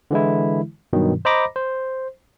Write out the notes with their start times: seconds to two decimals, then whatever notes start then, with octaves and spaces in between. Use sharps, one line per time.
0.11 D3 E3 G#3 E4
0.93 G2 B2 D#3 F#3
1.25 C5 D#5 A#5 B5 D6 A#6
1.56 C5